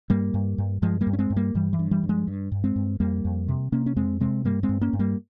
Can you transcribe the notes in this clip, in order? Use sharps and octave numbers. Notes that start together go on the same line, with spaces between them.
G2 G3 A#3
G2
G2
G2 F3 G#3
G3 A#3
G2
C#4
G#3 C4
G2
G3 A#3
G2 E3 G3
E3
G2
E3 G3
G2
F3 G#3
G2
G2
G#3 C4
G2
F2 G3 A#3
F2
C3
C3 A#3 C#4
C#4
F2 G#3 C4
C3 G#3 C4
G2 G3 A#3
G#3 C4
G2
A#3 C#4
G2
G3 A#3